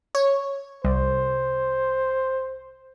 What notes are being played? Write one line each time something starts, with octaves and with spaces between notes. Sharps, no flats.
C#5
C2 C5